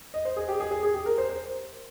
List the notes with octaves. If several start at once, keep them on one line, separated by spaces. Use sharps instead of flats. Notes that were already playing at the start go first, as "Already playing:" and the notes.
D#5
C5
G#4
G4
G#4
G#4
G#4
G4
A#4
C5
C5